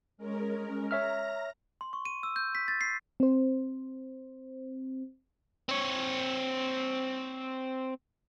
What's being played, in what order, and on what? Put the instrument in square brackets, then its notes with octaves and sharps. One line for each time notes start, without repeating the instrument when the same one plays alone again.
[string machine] G#3 C#4 A#4
[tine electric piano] C#5 E5 F6 [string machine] A#5 A#6
[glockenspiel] C6
C#6
D#7
E6
G6
B6
A6
C7
[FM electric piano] C4 C5
[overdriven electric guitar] C4 C#5